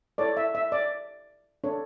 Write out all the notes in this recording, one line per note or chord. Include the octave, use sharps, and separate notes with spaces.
E4 A4 C#5 D5
E5
E5
D5
D4 A4 C#5